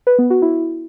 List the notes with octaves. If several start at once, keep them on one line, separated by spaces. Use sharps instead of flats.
B4
B3
F#4
E4